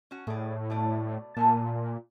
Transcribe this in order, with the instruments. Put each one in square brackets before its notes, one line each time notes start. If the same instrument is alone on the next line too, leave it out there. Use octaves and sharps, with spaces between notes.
[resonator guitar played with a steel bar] C#4 F#4
[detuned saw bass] A2 [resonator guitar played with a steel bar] G#4 D5
[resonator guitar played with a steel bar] B2 A3 D5
[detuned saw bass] A#2 [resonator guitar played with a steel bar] A3 G#5 A5